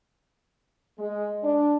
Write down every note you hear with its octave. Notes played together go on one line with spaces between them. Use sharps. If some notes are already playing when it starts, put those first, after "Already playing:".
G#3
D4